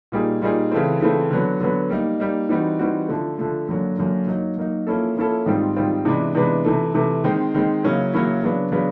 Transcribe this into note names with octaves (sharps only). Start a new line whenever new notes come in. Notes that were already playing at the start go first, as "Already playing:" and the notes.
A#2 G3 A#3 D#4 G#4
A#2 G3 A#3 D#4 G#4
C#3 E3 A3 C4
C#3 E3 A3 C4
D3 F#3 B3
D3 F#3 B3
G3 A#3 D#4
G3 A#3 D#4
E3 G3 C4 D#4 F#4
E3 G3 C4 D#4 F#4
D3 F3 A3
D3 F3 A3
F#2 D3 F#3 A#3
F#2 D3 F#3 A#3
F#3 A#3 D#4
F#3 A#3 D#4
F3 A#3 C#4 E4 A4
F3 A#3 C#4 E4 A4
G#2 D#3 G3 C4 F4
G#2 D#3 G3 C4 F4
C3 E3 G#3 B3 D4
C3 E3 G#3 B3 D4
C3 E3 A3
C3 E3 A3
D#3 G#3 C4
D#3 G#3 C4
C#3 F#3 A#3 C#4 E4
C#3 F#3 A#3 C#4 E4
C#3 F#3 B3 D4
C#3 F#3 B3 D4